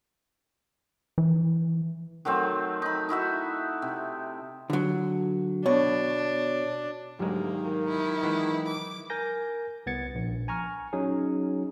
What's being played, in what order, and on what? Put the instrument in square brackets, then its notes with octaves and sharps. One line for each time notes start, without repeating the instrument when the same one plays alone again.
[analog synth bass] E3
[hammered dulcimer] D#3 F#3 A3 C4
D#4 B5
D#4 E4 F#4 E5
C3
[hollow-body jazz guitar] D3 F#3
[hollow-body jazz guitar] B2 [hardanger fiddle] D4 [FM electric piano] C#5
[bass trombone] D2 [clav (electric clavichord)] G#2 G#3 [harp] F#3 G4 A#4 [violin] A#3
[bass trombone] D#3
[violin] E4
[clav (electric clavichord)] E3 G#3 [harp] D#4 F#5
[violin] D6
[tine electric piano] A#4 G#5 G6 A#6
C2 B3 G#6 A6 C#7
A#1
G#5 A#5 C#6 F6
F#3 C#4 D#4 G#4